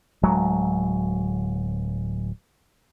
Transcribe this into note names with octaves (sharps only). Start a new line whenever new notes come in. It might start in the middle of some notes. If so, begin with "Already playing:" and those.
D1 F#3 G#3